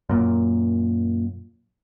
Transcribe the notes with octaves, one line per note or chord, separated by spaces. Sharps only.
F#2 A#2